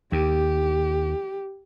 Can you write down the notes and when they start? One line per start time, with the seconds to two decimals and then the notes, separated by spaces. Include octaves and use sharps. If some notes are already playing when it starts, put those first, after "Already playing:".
0.12 D#2 G4